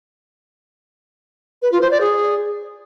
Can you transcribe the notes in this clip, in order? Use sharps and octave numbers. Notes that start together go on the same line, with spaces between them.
B4
F4
C5
D5
G#4